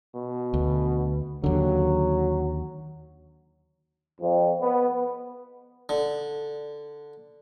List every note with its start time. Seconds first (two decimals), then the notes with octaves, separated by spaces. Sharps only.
0.15 B2
0.54 D2
1.44 D#2 D3 F#3
4.21 F2
4.61 B3
5.89 D3